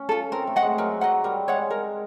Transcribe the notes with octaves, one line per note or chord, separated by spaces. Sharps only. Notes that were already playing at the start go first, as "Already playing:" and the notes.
Already playing: C#4
F4 A4
C4 A#4
A3
D#5 F#5
G#3
F#3 A#4
F#3 D#5 F#5
G3 A#4
G#3 C#5 F#5
A#4